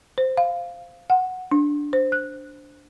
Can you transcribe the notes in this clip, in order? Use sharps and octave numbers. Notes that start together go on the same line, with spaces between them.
C5
F5
F#5
D4
C5
F#6